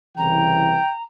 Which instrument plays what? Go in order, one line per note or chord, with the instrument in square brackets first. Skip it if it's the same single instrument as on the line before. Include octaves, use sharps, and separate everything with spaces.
[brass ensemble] C2 C#3 E3 [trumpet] G5 [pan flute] A#5